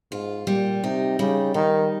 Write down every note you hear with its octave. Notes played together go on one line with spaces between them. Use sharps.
G#2 F4
A#2 G3
C3 D#4
C#3 G3
D#3 D#4